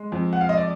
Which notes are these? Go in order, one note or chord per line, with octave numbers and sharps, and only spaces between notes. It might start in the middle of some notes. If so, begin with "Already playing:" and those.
Already playing: G#3
F2
F#5
F5
D#5
D5